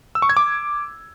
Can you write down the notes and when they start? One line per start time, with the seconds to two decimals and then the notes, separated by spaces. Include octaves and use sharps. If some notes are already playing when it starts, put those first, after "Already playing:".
0.15 E6
0.22 C#6
0.29 G#6
0.37 D6